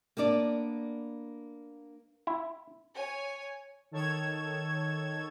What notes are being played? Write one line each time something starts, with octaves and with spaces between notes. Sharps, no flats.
A#3 B3 D4 D5
E4
C#5 G#5
D#3 A4 C#5 G#6 E7